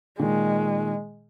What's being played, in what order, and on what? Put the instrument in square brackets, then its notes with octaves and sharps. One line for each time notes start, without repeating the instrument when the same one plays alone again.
[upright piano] A#2 D#3 [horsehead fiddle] G#3